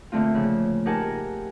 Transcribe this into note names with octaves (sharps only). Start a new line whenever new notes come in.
A#2 D3 A3 C4 F4
C#3 F3
D#4 G4 A#4 F#5 G#5 A5